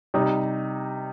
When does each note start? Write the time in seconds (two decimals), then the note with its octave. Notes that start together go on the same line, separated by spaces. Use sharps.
0.14 C3 G3 D#4